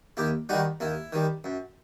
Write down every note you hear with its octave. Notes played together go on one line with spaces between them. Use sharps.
D#2 E4 G4
D#3 G3 D#4 F#4
D#2 E4
D#3 G3
F#2